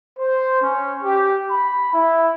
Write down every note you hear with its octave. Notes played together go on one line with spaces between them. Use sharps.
C5
C#4
G4
B5
E4